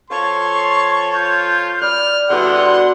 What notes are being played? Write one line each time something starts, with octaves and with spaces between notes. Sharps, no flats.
F3 A4 C#5 F5 C6 C#6
F4 G6
D5 B5 F6
E2 G2 D3 E4 F#4 D5 F#5 C6